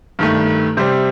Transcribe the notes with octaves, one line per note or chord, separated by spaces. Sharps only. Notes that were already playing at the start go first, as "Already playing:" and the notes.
G2 D#3 A3
C3 G3 C4 C5